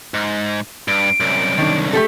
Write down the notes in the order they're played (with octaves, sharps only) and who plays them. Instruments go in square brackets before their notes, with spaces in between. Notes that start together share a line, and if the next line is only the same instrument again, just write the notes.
[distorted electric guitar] G#2
[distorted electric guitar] G2 [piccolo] D7
[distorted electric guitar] C2 F#2
[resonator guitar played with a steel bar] D#3 D4
A3 G4 A4